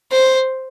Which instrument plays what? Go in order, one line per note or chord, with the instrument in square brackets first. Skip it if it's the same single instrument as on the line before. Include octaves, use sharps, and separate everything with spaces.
[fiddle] C5